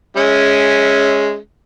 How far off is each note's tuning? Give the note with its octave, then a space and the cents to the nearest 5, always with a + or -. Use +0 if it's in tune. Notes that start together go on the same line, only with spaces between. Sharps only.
G#3 +0 C#4 +0 E5 -25